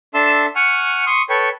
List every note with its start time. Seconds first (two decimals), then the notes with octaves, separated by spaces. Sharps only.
0.14 D4 A4 E5 A5 C6 E6
0.56 F#5 G#5 C#6 F6
1.07 C6 C#6 D#6
1.29 A4 B4 C#5 G5 C#6